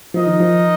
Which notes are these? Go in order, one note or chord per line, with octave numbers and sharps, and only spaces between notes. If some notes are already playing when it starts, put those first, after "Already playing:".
F3 D#4 A#4 D#5
D#3
F3